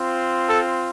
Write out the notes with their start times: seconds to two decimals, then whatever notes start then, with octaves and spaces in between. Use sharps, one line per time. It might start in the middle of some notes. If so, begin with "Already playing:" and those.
Already playing: C4 F4
0.49 A4